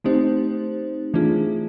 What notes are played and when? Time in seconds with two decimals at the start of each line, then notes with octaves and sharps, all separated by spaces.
0.04 A3 C4 D#4 G4 C5
1.14 E3 A3 D4 F4 G#4